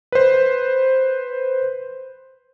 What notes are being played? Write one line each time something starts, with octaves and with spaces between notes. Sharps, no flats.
B4 C5